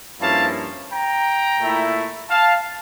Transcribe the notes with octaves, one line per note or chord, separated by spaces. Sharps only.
G2 F3 A#3 C#4 E4 F5 A5
G5 A#5
A#2 A3 E4
F5 A5